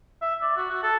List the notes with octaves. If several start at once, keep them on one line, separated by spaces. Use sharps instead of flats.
E5
D5
F#4
F#4
A4